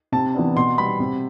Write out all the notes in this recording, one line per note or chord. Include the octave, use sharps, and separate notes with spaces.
C3 A5
E3 B3 D4
B2 C6
G3 B3 B5
C3